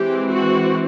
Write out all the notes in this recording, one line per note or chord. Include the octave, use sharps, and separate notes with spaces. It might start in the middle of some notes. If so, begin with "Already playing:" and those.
Already playing: E3 G#3 C4 G4
F#4